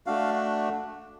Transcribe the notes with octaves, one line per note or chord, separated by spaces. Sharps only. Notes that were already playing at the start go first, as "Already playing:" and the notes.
A3 D4 F#4 F5